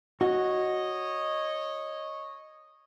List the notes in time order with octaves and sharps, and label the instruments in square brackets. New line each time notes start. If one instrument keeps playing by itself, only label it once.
[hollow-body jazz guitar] F#4 [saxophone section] C#5 D#5